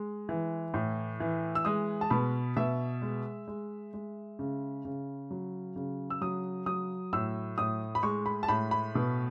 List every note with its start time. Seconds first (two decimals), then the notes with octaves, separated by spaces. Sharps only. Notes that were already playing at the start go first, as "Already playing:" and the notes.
Already playing: G#3
0.29 E3
0.74 A2
1.20 E3
1.55 E6
1.65 G#3 D#6
2.01 A5
2.10 B2 B5
2.57 B2 E5
3.02 G#3
3.48 G#3
3.93 G#3
4.39 C#3
4.85 C#3
5.31 F#3
5.76 C#3
6.10 E6
6.21 F#3 D#6
6.66 F#3 D#6
7.13 A2 E6
7.58 A2 D#6
7.95 B5
8.03 G#3 C#6
8.26 B5
8.43 A5
8.48 A2 B5
8.71 B5
8.95 B2